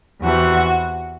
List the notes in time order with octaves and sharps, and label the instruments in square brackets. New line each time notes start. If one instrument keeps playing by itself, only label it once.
[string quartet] E2 C3 E3 F#4